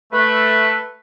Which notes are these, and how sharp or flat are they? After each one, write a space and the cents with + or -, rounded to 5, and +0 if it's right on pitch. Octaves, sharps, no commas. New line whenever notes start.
A3 +0 B4 +0